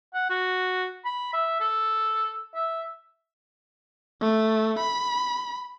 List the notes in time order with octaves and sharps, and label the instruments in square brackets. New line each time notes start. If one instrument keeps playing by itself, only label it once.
[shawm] F#5
F#4
B5
E5
A4
E5
[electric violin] A3
B5